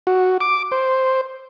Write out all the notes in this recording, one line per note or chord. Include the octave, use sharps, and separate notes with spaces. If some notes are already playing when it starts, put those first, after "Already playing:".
F#4
D6
C5